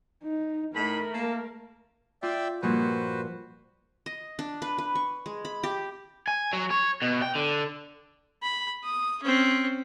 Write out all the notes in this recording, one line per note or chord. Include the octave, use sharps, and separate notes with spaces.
D#4
A2 A3 D#4 A#4 B5
A#3 A5
F4 D5 E5 G5
G2 A#2 F3 F#4 B4 C5
D#5
D4
B4
B4
C#6
G#3
B5
G4
G#5
F#3
C#5
B2
G5
D3
B5
D#6
C4 C#4